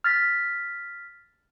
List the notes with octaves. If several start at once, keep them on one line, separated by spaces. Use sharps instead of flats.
F6 A6 B6